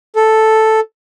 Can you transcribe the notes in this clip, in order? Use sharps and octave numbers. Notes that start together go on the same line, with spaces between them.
A4